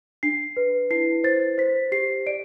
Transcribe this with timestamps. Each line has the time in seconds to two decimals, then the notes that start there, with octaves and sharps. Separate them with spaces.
0.23 D4 C7
0.57 B4
0.91 E4 C7
1.24 C5 A6
1.58 C5 B6
1.92 G4 C7
2.27 D5 D7